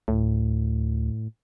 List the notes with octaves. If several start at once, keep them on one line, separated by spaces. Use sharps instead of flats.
D2 A2